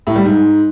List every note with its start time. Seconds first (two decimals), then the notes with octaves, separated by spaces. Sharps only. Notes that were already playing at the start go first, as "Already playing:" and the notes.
0.07 A2
0.16 G3
0.25 G#2